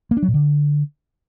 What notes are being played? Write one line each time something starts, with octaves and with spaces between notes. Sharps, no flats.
A#3
D4
F#3
A#2
D3